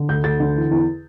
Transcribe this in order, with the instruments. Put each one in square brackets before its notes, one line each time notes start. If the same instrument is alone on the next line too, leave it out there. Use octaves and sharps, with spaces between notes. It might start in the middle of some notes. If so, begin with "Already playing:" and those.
Already playing: [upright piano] D3
D2 G6
D2 A6
D3
E3
E2